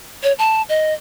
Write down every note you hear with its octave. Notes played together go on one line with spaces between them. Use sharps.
C#5
A5
D#5